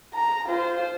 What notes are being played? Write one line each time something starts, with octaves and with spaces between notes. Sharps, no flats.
A#5
F4 C5